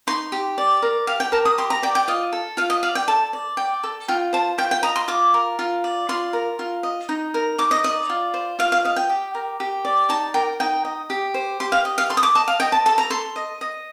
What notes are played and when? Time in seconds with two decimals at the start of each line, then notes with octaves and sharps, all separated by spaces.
0.07 D#4 C6
0.32 G4
0.58 D5
0.82 A#4
1.07 G4 F5
1.20 G5
1.32 A#4 A5
1.45 D#6
1.58 G4 C6
1.70 A#5
1.82 D5 G5
1.95 G5
2.08 F4 D#5
2.33 A4
2.57 F4 F5
2.70 D#5
2.83 D5 F5
2.95 G5
3.08 A4 A5
3.33 D5
3.57 D5 G5
3.84 A4
4.08 F4 G5
4.33 C5 A5
4.58 F4 G5
4.71 G5
4.83 D#5 A#5
4.96 C6
5.08 F4 D6
5.34 A#4
5.59 F4
5.84 D5
6.09 F4 C6
6.33 A#4
6.59 F4
6.83 D#5
7.09 D#4
7.34 A#4
7.58 D#4 D6
7.71 D#5
7.84 D5 D#5
8.10 F4
8.34 C5
8.59 F4 F5
8.72 F5
8.85 D#5 F5
8.96 G5
9.09 G4
9.35 A#4
9.60 G4
9.85 D5
10.09 D#4 A5
10.34 A#4 G5
10.60 D#4 G5
10.85 D#5
11.10 G4
11.34 C5
11.60 G4 C6
11.72 F5
11.85 D#5
11.98 F5
12.10 A4 C6
12.17 D#6
12.23 D6
12.35 D#5 A5
12.48 F5
12.60 D#5 G5
12.72 A5
12.86 A4 A5
12.98 A#5
13.10 A4 C6
13.36 D#5
13.61 D#5